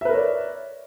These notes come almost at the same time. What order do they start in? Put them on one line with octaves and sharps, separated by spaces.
E5 B4 A#4 C#5 D5